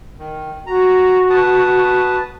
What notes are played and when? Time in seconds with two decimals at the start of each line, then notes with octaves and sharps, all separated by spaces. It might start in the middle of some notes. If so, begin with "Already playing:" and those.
0.19 D#3
0.67 F#4 A#5
1.30 B4 A5 D#6